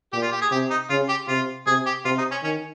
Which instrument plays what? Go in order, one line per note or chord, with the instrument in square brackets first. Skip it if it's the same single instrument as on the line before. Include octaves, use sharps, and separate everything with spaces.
[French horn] A#2 [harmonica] G4
[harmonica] F4
G4
G#4
[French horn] C3 [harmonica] G4
[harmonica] D#4
[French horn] C#3 [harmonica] F4
[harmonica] G4
[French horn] C3 [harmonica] F4
[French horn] C3 [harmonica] G#4
[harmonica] G4
[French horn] C3 [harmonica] F4
[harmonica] D#4
C#4
[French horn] D#3 [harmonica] C#4